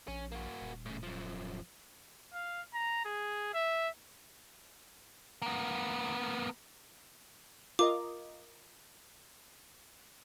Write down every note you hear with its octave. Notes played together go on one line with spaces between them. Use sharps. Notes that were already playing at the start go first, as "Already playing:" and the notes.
A#1 C#4
A#3 F#4
D#1
A2 C#3
F#2 F3
F5
A#5
G#4
E5
A#3 B3
F4 A#4 D#5 D6